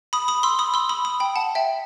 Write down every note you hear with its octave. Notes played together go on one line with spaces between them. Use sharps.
B5 D#6
B5 D#6
C6 E6
B5 D#6
C6 E6
B5 D#6
B5 D#6
G5 B5
F#5 A5
E5 G5